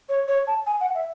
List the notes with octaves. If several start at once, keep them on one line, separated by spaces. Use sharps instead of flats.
C#5
C#5
A5
G#5
F#5
E5